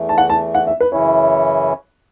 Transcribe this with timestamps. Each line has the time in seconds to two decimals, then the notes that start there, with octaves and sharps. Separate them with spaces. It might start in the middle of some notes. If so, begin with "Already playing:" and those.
Already playing: E2 E3 A3
0.09 A5
0.18 F#5
0.30 A5
0.55 F#5
0.67 E5
0.80 B4
0.92 F#2 C#3 E3 C#4 E4 C#5